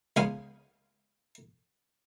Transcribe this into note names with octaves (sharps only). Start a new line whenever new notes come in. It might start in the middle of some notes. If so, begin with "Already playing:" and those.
C#2 B3 F5 G#5